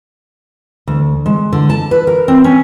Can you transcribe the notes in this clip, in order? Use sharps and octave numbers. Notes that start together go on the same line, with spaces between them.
D2
G#3
D3
A5
B4
A#4
C4
C#4